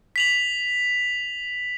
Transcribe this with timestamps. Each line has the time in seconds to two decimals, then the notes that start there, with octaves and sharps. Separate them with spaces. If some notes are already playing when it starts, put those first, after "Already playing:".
0.16 B6 F7 F#7